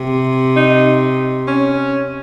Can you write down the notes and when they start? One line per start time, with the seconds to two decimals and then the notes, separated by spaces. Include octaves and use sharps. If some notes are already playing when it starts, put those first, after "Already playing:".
Already playing: C3
0.56 D#4
1.48 C#4